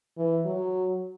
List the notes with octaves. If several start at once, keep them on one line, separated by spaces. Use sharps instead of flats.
E3
F#3